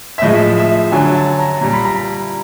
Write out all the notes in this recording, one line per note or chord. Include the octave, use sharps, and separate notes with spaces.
E5
A2 F3 G#3 D#5
E5
D3 F#3 G#5
A5
A#5
A#2 G3 A#5
B5
A#5